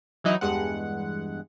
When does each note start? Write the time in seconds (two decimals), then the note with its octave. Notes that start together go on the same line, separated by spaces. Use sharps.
0.24 E3 F#3 D#4 E4
0.41 E2 G2 G#3 F#5